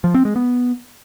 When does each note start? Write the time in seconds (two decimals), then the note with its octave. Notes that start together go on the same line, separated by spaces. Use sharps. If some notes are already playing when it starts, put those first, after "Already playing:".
0.04 F3
0.14 C4
0.25 G#3
0.36 B3